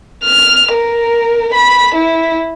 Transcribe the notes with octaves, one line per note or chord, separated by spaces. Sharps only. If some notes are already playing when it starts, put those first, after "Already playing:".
F6
A#4
B5
E4